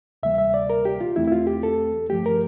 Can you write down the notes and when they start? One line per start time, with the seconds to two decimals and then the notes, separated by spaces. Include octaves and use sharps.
0.23 D2 C3 E3 G3 A#3 E5
0.38 E5
0.54 D5
0.70 A#4
0.85 G4
1.01 F4
1.16 E2 E3 A3 C4 E4
1.28 E4
1.32 F4
1.47 G4
1.63 A4
2.09 G2 F3 A3 G4
2.26 A#4